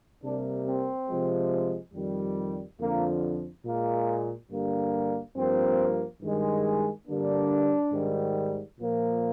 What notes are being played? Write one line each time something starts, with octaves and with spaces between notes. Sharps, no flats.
C3 G3 A#3 D4
C4
C3 F3 G#3
F2 D#3 G3
F2 D3 F3 A#3
A#2 G#3 A#3
G2 D3 G3 A#3
G2 F3 A#3 C4
G2 D#3 G#3
G2 D3 G3 A#3 D4
G#2 D#3 G3
A#2 F3 A#3